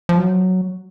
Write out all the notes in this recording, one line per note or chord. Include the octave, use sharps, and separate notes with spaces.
F3
F#3